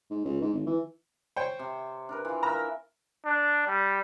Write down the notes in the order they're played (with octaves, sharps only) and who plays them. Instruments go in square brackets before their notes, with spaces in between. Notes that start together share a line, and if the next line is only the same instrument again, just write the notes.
[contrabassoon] G#2
C#2
G#2
G#1
E3
[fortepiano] C5 C#5 G5
[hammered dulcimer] C3
D4 A#4 B4
E3 F4
[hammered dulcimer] A#4 E5 [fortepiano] A#5
[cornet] D4
G3